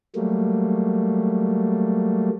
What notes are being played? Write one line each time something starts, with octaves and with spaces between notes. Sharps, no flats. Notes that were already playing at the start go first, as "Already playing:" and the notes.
F#3 G3 A3 A#3